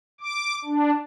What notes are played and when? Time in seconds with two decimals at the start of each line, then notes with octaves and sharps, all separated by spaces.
0.21 D6
0.64 D4